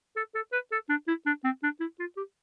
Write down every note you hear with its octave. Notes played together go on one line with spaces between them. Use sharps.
A4
A4
B4
A4
D4
E4
D4
C4
D4
E4
F4
G4